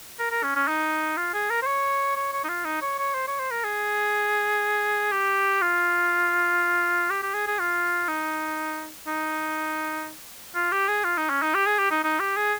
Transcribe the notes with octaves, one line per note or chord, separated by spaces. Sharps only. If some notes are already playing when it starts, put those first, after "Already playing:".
A#4
A#4
C#4
C#4
D#4
F4
G#4
A#4
C5
C#5
C#5
C#5
D#4
F4
D#4
C#5
C#5
C5
C#5
C5
A#4
G#4
G4
F4
G4
G4
G#4
G#4
F4
D#4
D#4
F4
G4
G#4
F4
D#4
C#4
D#4
G4
G#4
G4
D#4
D#4
G4
G#4